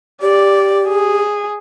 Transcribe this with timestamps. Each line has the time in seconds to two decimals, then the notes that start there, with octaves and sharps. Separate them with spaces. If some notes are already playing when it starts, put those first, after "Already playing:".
0.22 G4 D5
0.89 G#4